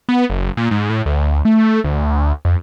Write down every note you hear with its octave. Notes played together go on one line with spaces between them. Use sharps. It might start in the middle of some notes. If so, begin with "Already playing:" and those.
B3
F#1
A#2
G#2
A2
D2
A3
D2
F2